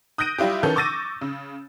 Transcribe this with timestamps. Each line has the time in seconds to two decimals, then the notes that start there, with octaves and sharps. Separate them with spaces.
0.18 D#6 F#6 G6 A#6 D7 D#7
0.38 G3 E4 F4 G4
0.63 D#3 E3 C#4 A4 G6
0.76 C#6 D6 E6 A6 A#6 D#7
1.21 C#3